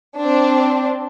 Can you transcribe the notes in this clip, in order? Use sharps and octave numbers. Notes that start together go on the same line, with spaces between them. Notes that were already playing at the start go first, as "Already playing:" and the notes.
C4 D4